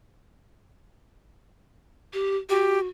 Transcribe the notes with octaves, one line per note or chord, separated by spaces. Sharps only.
G4
F#4 G4